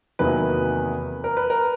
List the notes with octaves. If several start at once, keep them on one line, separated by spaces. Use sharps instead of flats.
E2 C3 D#3 F#3 A#3 B4
A#4
B4
A#4